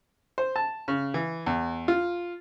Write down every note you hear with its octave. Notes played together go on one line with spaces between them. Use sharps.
C5
A5
C#3
E3
E2
F4